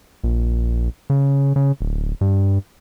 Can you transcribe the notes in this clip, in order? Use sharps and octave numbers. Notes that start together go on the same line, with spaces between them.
A#1
C#3
C#3
D1
G2